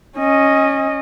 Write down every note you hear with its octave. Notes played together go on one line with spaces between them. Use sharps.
C#4 D#5